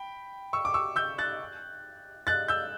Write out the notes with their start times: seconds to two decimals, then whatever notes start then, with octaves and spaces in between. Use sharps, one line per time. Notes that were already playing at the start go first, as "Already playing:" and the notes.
Already playing: G5 B5
0.53 C#6 E6
0.65 D6
0.74 C#6 E6
0.96 E6 G6
1.18 F#6 A6
2.27 F#6 A6
2.48 E6 G6